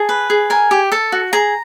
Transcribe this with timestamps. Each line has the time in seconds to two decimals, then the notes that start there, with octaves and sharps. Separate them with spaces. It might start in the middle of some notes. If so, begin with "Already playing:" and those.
Already playing: G#4 A5
0.09 B4
0.30 G#4
0.50 A#4 G#5
0.71 G4
0.92 A4 A5
1.12 F#4
1.33 G#4 A#5